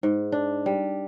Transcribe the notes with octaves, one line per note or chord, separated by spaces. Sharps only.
G#2
D4
G3